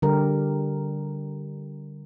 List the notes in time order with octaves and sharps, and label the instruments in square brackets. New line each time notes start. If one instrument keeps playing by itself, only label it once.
[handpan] D3 G3 G4 A#4